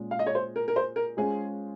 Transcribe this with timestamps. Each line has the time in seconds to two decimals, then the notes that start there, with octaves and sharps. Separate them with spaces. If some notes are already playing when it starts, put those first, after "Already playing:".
Already playing: A#2 G#3 C#4
0.11 F5
0.19 D#5
0.26 C#5
0.35 C5
0.56 A#4
0.68 A#4
0.76 C5
0.96 A#4
1.17 G#3 C#4 F4 G#4 C5